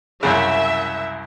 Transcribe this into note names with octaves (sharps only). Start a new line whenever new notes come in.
C2 F#2 C#3 E5